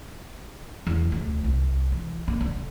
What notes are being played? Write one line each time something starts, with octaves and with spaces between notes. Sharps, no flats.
E2
D2
C2
E3
A#3
D3